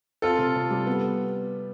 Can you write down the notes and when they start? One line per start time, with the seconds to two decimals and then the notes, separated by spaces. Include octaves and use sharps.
0.22 C4 F4 A4
0.39 C3
0.56 C3
0.70 G3
0.87 B3